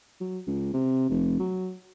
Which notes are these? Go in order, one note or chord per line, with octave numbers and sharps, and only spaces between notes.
F#3
C#2
C3
F1
F#3